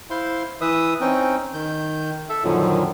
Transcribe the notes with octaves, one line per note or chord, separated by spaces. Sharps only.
E4 C5 F5 C6
E3 B4 E5 D#6
C4 C#4 D#4 G5
D#3 G6
A4 E5
F#2 A#2 D3 D#3 F3 F#3